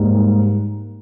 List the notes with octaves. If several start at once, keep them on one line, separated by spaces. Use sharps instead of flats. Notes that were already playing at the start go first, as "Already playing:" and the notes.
Already playing: G#2 G3 A#3